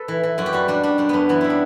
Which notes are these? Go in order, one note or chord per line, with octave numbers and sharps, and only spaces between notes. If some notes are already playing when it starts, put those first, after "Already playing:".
Already playing: A4 B4
E3
E3
F#2 F#4
G4
G3 F#4
G3 D4
G3 D4
F#2 D4
F#2 B3 C#4
E3 B3
G3 E4
D4